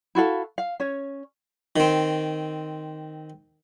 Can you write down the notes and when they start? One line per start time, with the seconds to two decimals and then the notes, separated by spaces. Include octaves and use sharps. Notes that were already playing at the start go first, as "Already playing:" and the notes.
0.15 E4 F#4 A4 F5
0.58 F5
0.80 C#4 C#5
1.76 D#3 C4